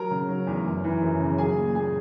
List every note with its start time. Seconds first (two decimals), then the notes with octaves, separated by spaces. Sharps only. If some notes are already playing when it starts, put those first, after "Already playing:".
Already playing: F#3 A#4 A#5
0.11 C#3
0.29 F#3
0.47 E2
0.66 F#2
0.84 E3
1.02 F#2
1.20 C#3
1.38 F#3 G#4 G#5
1.58 A#2
1.75 A#2 G#4 G#5